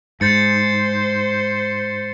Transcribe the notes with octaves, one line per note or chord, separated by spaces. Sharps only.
G#2 C5 G6 A6 C#7